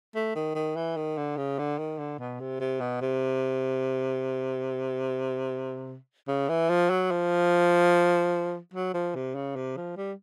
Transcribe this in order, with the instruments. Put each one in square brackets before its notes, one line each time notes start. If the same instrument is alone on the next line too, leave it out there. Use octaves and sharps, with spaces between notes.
[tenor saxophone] A3
D#3
D#3
E3
D#3
D3
C#3
D3
D#3
D3
B2
C3
C3
B2
C3
C#3
E3
F3
F#3
F3
F#3
F3
C3
C#3
C3
F3
G3